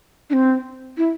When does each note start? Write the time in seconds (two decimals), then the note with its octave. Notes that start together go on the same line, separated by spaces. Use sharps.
0.30 D4
0.33 C4
0.97 E4